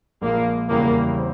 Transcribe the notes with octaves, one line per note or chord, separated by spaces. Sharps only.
A#1 A#2 G#3 A#3
E2 C#3 G3 A#3 C#4 E4
C4